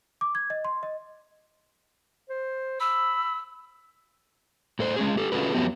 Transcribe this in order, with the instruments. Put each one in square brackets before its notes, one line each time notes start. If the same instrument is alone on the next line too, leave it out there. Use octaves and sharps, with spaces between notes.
[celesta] D6
G#6
D#5
C6
D#5
[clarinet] C5
[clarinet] B5 [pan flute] E6
[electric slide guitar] A2 A4 C5
G#3 C#4 G#4
G4 A4
C#4 F4 F#4 G#4 A4 B4
F2 F#3 B3 G4